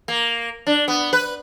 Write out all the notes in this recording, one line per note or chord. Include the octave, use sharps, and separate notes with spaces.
A#3
D4
B3
B4